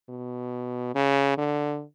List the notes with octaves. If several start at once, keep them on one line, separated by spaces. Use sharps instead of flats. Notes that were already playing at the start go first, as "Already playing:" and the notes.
B2
C#3
D3